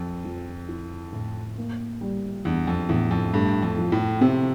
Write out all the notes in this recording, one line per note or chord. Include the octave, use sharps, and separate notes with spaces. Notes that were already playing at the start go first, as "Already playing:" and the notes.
Already playing: F2 C4
F3
E4
A2
A#3
G3
E2 D4
F2
E2 A2
F2
G2 A3
F2
F3
A2
C3 C4